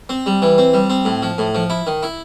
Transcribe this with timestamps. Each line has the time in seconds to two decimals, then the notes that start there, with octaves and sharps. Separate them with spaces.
0.09 C4
0.26 G3
0.42 E3
0.58 C4
0.74 G3
0.90 C4
1.05 A2
1.22 F3
1.38 A2
1.55 F3
1.70 E4
1.87 D#3
2.03 E4